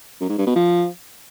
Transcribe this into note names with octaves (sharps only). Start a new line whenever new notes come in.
F#2
G#2
G2
B2
F3